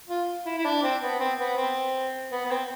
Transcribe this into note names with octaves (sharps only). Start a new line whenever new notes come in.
F4
E4
E4
D4
C4
B3
C4
B3
C4
B3
B3
C4